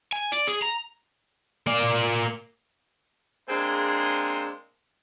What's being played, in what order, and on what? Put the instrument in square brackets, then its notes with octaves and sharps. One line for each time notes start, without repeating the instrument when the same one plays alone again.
[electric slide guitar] G#5
D5
G#4
A#5
[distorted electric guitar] A#3 D5
[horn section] G#3 A#3 C4 D4 G#4 C5